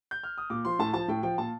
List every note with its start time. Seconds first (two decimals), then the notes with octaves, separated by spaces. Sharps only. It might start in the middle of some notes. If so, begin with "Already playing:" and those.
0.11 G6
0.23 F6
0.38 D#6
0.50 A#2 D6
0.65 F3 C6
0.79 A2 A5
0.93 F3 A5
1.08 A2 G5
1.23 F3 G5
1.38 A#2 A5